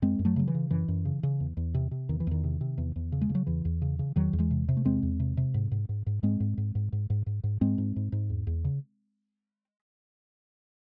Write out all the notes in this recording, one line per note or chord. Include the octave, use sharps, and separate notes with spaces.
F#2 G#3 C4
F#2
F#3 A3
C#3 F#3
E3
C#3
F#2 E3
F#2
C#3
C#3
E2
E2
C3
C3
E2 D#3
E3
E2 D#3
C3
C3
E2
E2
C#3
G#3
C#3
F#3
E2 E3
E2
C#3
C#3
E2 D#3 F#3
E2
E3 G#3
C3
C3
A3
E2 G#3 C4
E2
C3
C3
G#2
G#2
G#2
G#2
G#2 G#3 C4
G#2
G#2
G#2
G#2
G#2
G#2
G#2
G#2 G#3 C4
G#2
G#2
G#2
E2
E2
C#3